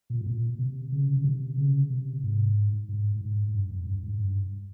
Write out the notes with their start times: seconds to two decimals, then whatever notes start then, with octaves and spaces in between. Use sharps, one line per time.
0.10 A#2
0.21 G#2
0.26 A#2
0.59 C3
0.92 C#3
1.17 C#3
1.24 C3
1.57 C#3
1.90 C3
2.23 G#2
2.89 G#2
3.21 G#2
3.54 G2
3.70 F2
3.87 G2
4.03 G#2
4.20 G2